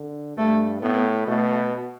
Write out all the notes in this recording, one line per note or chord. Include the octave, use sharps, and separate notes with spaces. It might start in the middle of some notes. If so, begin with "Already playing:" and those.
Already playing: D3
G2 A3
A2 B3
B2 A3